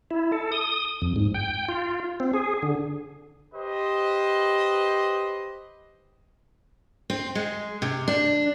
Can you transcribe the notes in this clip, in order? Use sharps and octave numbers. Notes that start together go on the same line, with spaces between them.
E4
A4
D#6
F2
G#2
G5
F4
C4
G#4
D3
G4 B4 C5 D#5
C4
G#3
C3
D4